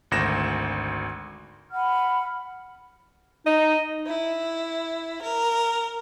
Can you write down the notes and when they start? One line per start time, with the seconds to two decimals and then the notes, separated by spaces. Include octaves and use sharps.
0.11 G#1 D2 A#6 E7
1.71 F#5 B5 F6
3.46 D#4 D#5
4.06 E4
5.23 A#4